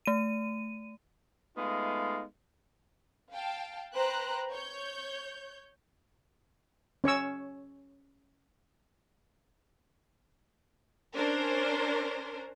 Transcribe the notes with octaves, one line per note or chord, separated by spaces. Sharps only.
A3 D#7
G#3 A3 B3 D#4 F4 F5
F5 G5 A5
B4 C5 G5 A#5 F#6
C#5 G6
C#4 C#5 C#6 E6
C#4 D4 A#4 C5